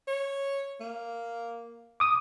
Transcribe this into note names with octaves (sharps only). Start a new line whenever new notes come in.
C#5
A#3
D6 D#6